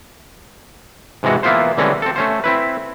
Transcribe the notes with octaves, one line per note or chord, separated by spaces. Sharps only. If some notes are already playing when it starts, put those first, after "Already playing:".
G#2 C3 E3 G#3 F#4
E3 A#3 B3 E4 F4 C5
D3 E3 G3 G#3 C4 C#4
C4 A4
A3 C#4 C5
C4 E4 B4